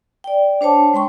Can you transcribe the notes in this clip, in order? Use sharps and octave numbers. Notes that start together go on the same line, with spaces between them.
D5 G5
D4 C5 C#5 A5 D6
G#3 G5 C6 C#6